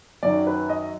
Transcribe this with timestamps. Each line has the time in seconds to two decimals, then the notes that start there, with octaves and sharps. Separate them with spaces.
0.23 F#2 D#3 F#3 D5
0.47 B4
0.69 D#5